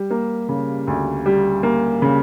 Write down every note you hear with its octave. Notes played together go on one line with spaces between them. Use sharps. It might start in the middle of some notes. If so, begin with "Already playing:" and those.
Already playing: G3
A#3
C#3
D2
G3
A#3
C#3